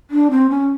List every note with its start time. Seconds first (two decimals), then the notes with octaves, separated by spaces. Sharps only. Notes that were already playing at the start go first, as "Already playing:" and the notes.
0.10 D4
0.31 C4
0.50 C#4